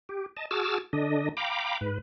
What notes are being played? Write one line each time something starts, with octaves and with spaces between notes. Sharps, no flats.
G4
D#5 A5
F#4 G#4 A5 D6 E6 F6
D3 D4 D#5
F5 G5 A#5 B5 D6
G#2 B4